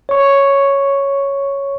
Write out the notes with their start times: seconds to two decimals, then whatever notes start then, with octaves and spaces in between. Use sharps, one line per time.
0.09 C#5 C#6